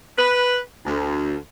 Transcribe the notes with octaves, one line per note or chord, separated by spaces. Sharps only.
B4
D2